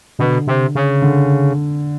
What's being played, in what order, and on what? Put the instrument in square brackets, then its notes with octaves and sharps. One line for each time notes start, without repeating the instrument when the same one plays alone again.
[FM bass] B2 [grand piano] D3
[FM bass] C3
C#3
[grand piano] D3